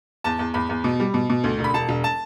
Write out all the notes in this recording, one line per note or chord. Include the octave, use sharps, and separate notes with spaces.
E2 A5
E2
E2 B5
E2
B2
G3
B2
B2
D2
E1
B5
E1 A5
E1
A5